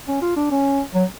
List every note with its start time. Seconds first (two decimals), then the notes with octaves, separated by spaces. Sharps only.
0.08 C#4
0.22 F4
0.36 D4
0.51 C#4
0.94 F#3